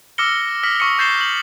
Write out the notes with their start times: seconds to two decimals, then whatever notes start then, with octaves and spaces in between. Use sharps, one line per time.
0.18 D6 E6 F6 A#6 C#7 G7
0.63 D#6 F6 A#6 B6 C#7 F#7
0.80 C#6 D#6 F6 C#7
0.98 C#6 G6 A6 C7 E7 G7
1.21 F#7